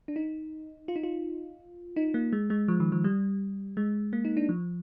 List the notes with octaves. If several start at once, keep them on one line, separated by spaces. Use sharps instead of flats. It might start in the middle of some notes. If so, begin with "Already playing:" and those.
D4
D#4
F4
D#4
F4
D#4
A#3
G#3
G#3
F3
D#3
F3
G3
G#3
A#3
D#4
D4
F3